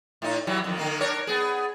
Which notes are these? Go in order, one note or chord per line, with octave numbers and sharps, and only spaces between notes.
A2 D#4
E3 F#3 G3
F2 D#3
D3 D#3 A#3
D4 A#4 C#5
B3 G#4